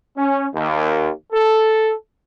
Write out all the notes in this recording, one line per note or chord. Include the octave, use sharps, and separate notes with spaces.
C#4
D#2
A4